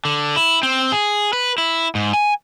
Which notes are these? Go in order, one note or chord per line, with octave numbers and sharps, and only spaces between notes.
D3
E4
C4
G#4
B4
E4
G#2
G#5